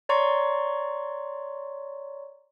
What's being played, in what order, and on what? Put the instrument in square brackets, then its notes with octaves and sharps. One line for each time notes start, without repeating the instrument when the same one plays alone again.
[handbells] C#5 D5 A#5 C6 C#6